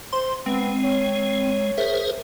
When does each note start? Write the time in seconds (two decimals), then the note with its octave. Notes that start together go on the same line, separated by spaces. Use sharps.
0.12 C5 C6
0.46 G#3 B3 C4
0.85 C#5
1.78 G#4 A#4 C5 E5